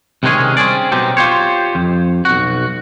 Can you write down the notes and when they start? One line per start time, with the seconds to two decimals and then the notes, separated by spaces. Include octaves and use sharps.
0.23 C2 C3 D#3 G#3 C#4 G#4
0.57 C4 C#4 G#4 D5
0.92 B2 F#3 C4 D#4 G4 A4
1.17 F4 G4 C5 C#5
1.75 F2
2.25 B1 F#4